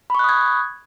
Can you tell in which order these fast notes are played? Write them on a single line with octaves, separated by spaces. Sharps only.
B5 C#6 F#6 D#6 G#6